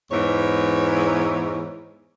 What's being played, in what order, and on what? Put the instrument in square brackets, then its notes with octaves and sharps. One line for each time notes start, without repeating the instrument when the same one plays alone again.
[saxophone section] E2 G#2 E3 C#5